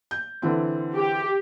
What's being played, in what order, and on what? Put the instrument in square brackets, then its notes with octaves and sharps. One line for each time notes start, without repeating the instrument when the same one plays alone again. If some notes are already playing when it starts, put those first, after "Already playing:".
[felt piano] G6
D3 E3 C4
[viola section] G4